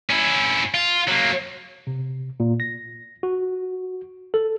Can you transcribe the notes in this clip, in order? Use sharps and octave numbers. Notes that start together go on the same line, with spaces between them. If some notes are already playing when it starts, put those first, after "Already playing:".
C#4 E4
F4
F#3 A#3
C3
A#2
A#6
F#4
A4